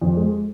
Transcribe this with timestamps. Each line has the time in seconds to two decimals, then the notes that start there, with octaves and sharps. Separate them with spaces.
0.01 F2
0.17 G#3